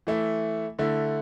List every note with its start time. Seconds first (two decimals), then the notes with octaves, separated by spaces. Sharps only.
0.07 E3 A3 E4
0.79 D3 A3 E4